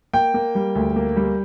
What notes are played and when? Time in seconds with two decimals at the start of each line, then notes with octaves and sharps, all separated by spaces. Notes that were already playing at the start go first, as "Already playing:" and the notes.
0.13 A#3 G5
0.34 A#3
0.55 G3
0.75 D2
0.96 A#3
1.16 G3